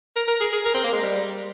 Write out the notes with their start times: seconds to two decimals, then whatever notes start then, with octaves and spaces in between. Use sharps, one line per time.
0.16 A#4
0.28 A#4
0.40 G#4
0.52 G#4
0.65 A#4
0.74 C4
0.84 A#3
0.92 G#3
1.02 G3